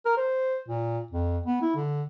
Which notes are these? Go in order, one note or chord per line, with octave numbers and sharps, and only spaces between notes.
A#4
C5
A#2
F2
B3
E4
D3